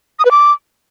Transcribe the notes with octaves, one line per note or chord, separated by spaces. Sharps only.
D#6
B4
D6